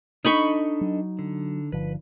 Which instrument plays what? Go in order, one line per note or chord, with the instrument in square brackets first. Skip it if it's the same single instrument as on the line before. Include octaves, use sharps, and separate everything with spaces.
[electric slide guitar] D4 A4 D#5 [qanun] D#4 B5 C#6
[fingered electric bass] F#3
[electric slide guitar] D3
[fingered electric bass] G1 D3 F3 [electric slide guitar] B4